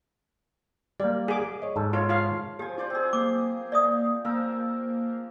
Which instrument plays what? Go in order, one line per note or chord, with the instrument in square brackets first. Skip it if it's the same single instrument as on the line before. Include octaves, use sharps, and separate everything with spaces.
[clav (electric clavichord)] G3 A#3 [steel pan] D5
[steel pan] G#4 D6
[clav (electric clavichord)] C#5 D#5
G#2 A4 A5
[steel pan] F4 C#5
F4 F5
[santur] F3 G#5 [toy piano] G4
[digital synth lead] F4 [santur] C5 D5 D6
[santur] C4 G#4
[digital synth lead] A#3 [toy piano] D6
[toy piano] D5 E5 D#6
[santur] F3 A#4 E6 [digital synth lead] A#3